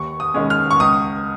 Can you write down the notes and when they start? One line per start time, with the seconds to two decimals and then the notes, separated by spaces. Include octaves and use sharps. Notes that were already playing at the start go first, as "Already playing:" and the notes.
Already playing: D#2 C#6
0.20 D#6
0.34 D#3 G#3 C#4
0.50 F6
0.71 C#6
0.80 C#2 D#6